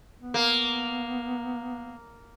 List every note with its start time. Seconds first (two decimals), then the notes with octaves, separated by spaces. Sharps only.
0.21 B3
0.34 A#3